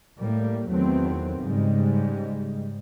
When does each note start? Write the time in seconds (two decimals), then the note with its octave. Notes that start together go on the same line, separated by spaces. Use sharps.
0.18 A2 G3 A#3
0.68 E2 D#3 F#3 A3 B3 C4
1.40 G#2 C#3 G3 G#3